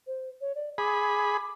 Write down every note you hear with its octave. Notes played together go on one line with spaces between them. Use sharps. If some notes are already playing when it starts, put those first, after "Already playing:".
C5
C#5
D5
G#4 B5 D6